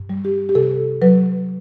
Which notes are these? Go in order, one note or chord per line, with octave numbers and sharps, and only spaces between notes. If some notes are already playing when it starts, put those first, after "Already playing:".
Already playing: G2
G3
G4
G4
C3 A4
F#3 B4